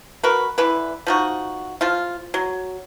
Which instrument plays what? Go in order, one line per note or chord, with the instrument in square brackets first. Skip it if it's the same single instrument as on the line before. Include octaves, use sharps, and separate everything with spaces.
[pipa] F#4 A#4 B4
D3 E3 B4
F3 D#4 F#4
F3 F4
F#3